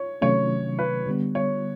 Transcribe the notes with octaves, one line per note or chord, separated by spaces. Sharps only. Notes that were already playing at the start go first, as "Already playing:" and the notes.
Already playing: C#5
C3 D#3 F#3 A3 C#4 C#5
B4
D3 G3 B3
C#5